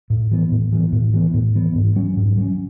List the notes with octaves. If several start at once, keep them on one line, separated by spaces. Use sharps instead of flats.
A2
E3 B3
A2
E3 B3
A2
E3 B3
A2
E3 B3
G#2
F#3 C#4
G#2
F#3 C#4